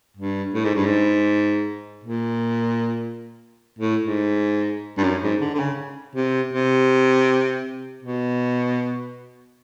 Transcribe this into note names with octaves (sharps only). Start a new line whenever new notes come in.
G2
A2
G#2
G2
G#2
A#2
A2
G#2
G2
F#2
G#2
D3
D3
C#3
C3
C3
B2